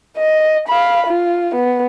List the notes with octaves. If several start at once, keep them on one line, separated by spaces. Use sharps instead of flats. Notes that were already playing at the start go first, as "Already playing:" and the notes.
D#5
F5 B5
F4
B3